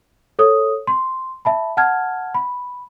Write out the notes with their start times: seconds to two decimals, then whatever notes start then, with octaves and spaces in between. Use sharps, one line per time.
0.39 A4 C#5 D#6
0.87 C6
1.45 E5 A5 B5
1.77 F#5 A5 F6 G#6
2.34 B5